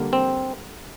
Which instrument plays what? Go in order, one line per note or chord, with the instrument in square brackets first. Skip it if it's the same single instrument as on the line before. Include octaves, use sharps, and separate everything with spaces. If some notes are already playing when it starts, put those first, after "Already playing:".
Already playing: [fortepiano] D3 G3 A#3
[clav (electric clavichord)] C4